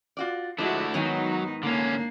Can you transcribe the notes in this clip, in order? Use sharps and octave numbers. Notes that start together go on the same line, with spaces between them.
F4 F#4 D5
F3 G#3 A3 D4 E4 F#4
G#2 D#3 F#3 B3 D#4 G#5
D3 A#3 C#4 D4